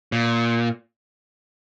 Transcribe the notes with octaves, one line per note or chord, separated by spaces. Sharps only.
A#2